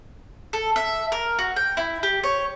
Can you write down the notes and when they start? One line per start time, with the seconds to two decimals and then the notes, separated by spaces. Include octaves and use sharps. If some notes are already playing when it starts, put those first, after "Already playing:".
0.53 A4
0.76 E5
1.12 A#4
1.39 F#4
1.56 G5
1.77 E4
2.03 G4
2.23 C#5